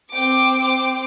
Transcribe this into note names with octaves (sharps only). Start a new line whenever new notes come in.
C4 G5 D6